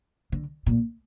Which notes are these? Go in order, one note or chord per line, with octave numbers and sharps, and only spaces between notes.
D3
A#2